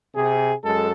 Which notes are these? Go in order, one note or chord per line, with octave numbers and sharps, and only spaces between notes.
C3 G#4
F#2 G#3 A4